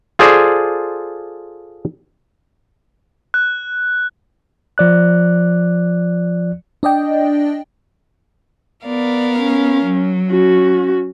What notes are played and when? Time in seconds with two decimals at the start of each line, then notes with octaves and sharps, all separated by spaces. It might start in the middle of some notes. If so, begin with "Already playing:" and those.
0.19 F4 G#4 A4 C5 D5
3.34 F#6
4.78 F3 D5 F#6
6.83 D4 D5 D#5 G5
8.86 B3 A#4 D5 F5
9.39 C#4
9.84 F#3
10.30 C#4 F#4